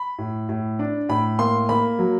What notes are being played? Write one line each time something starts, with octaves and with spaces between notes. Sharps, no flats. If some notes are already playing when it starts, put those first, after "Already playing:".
Already playing: B5
A2
A2
D4
A2 B5
A#3 C6
A#3 B5
F#3